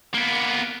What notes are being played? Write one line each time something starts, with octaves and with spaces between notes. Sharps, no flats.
A#3 B3